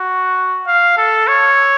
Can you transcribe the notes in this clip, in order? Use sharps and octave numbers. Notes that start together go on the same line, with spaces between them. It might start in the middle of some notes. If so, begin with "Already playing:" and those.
Already playing: F#4
F5
A4
C#5